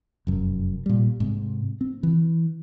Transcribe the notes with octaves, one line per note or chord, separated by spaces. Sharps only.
F1 F#2
A#2 G3
G#2 C3
C4
E3